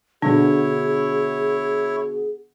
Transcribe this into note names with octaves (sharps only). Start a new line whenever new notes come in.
B2 D3 D4 E4 G#4 C#5